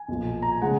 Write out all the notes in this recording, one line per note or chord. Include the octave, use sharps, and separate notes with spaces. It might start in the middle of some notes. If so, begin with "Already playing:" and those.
Already playing: G#5
B1 A#2 F3
A#5
G#5
C#3 G#3 F#5